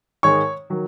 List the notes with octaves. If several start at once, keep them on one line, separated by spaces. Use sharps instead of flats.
G#2 D#3 G#3 C#5 C#6
D#3 F#3